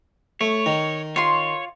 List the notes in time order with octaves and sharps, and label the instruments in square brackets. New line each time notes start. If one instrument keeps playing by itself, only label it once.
[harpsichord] A3 [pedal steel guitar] C#5
[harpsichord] D#3
[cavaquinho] F4 C6 [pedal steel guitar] C#5